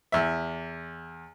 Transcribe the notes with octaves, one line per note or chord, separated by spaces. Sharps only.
E2 E5